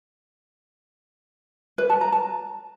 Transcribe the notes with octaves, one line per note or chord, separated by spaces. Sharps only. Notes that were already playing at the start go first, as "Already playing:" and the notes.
B4
A5
A#5
A5